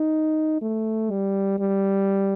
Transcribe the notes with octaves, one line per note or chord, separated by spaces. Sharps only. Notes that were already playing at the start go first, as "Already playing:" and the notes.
Already playing: D#4
A3
G3
G3